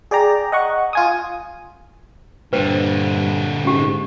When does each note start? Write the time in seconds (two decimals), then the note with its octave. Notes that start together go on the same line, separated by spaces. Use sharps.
0.11 G#4 D5 G5 A#5
0.52 D#5 F#5 C#6
0.93 F4 G#5 D#6
2.53 G2 A#2 D3 B4 C5 G5
3.65 G#2 C#4 G4